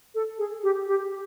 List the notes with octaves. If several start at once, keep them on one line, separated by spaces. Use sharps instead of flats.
A4
G#4
G4
G4